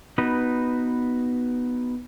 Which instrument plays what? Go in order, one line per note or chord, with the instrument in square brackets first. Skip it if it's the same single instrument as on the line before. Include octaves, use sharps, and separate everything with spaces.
[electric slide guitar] B3 D#4 F#4 B4